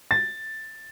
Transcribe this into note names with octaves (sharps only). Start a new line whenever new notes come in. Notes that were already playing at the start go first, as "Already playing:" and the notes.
A6